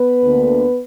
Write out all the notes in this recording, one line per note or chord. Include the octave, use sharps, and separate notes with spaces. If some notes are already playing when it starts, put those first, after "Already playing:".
Already playing: B3 B4
D2 D3 A#3